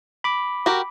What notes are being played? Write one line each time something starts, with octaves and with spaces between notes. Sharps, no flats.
B5 D6
F#4 G4 A#4